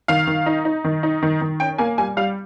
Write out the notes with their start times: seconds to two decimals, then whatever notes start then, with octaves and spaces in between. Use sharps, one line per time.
0.08 D#3 F5
0.27 D#3
0.46 D#4
0.65 D#4
0.85 D#3
1.03 D#4
1.23 D#3
1.41 D#3
1.60 C#4 G5
1.78 A#3 G#5
1.98 G3 G#5
2.17 G3 F5